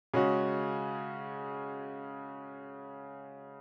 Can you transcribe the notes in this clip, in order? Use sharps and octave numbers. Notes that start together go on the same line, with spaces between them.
C#3 G#3 C#4 F#4